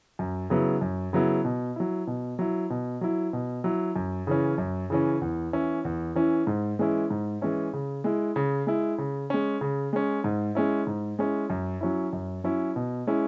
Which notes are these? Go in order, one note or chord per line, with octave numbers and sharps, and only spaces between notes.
F#2
C#3 F#3 B3 E4
F#2
C#3 F#3 B3 E4
B2
F#3 E4
B2
F#3 E4
B2
F#3 E4
B2
F#3 E4
F#2
C#3 E3 C#4
F#2
C#3 E3 C#4
E2
E3 C#4 E4
E2
E3 C#4 E4
G#2
E3 G#3 C#4 E4
G#2
E3 G#3 C#4 E4
C#3
G#3 E4
C#3
G#3 E4
C#3
G#3 C#4
C#3
G#3 C#4
G#2
G#3 C#4 E4
G#2
G#3 C#4 E4
F#2
F#3 C#4 E4
F#2
F#3 C#4 E4
B2
G#3 C#4 E4